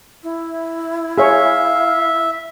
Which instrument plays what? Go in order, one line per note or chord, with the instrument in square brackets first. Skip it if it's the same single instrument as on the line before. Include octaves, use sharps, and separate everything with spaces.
[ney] E4
[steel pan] G#4 C#5 [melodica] E5 [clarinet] F5